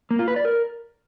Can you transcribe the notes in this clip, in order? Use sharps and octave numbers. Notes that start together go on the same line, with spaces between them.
A#3
F4
B4
D5
A#4